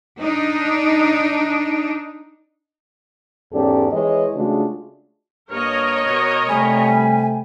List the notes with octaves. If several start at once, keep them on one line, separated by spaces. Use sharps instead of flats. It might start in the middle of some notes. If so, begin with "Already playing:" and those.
D4 D#4
E2 G#2 C#4 G4 A4 D5
E3 G#3 C#5 D#5
C#3 G#3 A3 D4 F4 F#4
G2 A#3 A#4 C#5 D#5 F6
B2 B3
C3 G3 A3 G5 G#5 B5